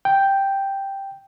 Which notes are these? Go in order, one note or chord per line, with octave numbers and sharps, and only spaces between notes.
G5